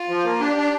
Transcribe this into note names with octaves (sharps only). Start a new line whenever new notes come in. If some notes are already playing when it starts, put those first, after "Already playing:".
Already playing: F4
F3
A#3
D4 G4
D4